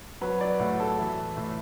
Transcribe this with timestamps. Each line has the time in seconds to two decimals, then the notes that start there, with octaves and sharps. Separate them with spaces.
0.21 F#3 B4
0.41 D5
0.59 A2 F#5
0.80 A4
0.99 E3
1.37 A2